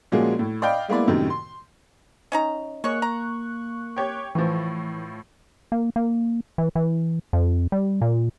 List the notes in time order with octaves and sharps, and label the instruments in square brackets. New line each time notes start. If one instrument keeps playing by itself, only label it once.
[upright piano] A#2 F3 G#3 A#3 C#4 F#4
A2
D5 D#5 F5 G5 B5
G#3 A#3 B3 E4 D5
F#2 A2 C3 D#3
C6
[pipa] C#4 D#4 A#5
[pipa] G#3 C#5 [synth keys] A#3 C#6 F#6
[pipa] A#5
[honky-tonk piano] G4 C#5 G5
[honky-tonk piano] A2 F3 [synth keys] E3
[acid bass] A#3
A#3
E3
E3
F2
G3
A#2